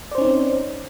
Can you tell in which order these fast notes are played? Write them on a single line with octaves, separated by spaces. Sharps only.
D5 C5 C#4 D#4 C4